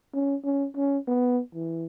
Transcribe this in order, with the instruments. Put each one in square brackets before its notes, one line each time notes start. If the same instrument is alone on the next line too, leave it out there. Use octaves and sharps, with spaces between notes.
[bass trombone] C#4
C#4
C#4
B3
E3